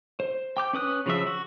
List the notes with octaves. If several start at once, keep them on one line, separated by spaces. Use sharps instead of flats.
C5
G5 D6 G6
C#4 B4 D#6 F#6
C#3 F3 F#3 E5
F#4